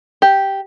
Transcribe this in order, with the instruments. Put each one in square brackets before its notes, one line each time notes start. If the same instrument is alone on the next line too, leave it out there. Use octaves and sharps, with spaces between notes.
[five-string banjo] G4